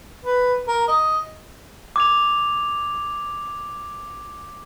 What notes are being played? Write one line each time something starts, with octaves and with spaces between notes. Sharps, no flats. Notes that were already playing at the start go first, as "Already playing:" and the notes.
B4
A#4
D#5
D6 G#6 F7